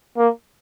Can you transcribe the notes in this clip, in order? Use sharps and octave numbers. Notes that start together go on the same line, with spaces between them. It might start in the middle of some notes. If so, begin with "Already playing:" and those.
A#3